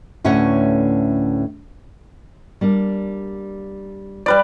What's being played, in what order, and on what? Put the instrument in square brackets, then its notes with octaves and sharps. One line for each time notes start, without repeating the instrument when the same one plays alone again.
[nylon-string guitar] D2 A2 C#4 B4 C#5 F#5
G3 A#3 D4
[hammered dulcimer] G3 B4 D5